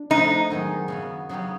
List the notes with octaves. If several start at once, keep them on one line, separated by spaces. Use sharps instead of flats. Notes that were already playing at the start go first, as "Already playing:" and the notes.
Already playing: D4
F3 A3 C4 D#4 E4
F#2 D#3 G#3 B3
C#3 F#3 B3
C#3 F#3 B3 D#4 G4